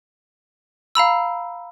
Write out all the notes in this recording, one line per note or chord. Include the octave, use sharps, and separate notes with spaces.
F5 A#5 B5 E6